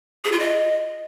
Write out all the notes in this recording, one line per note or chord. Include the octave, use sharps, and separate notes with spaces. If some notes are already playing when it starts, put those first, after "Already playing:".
G#4
F4
D#5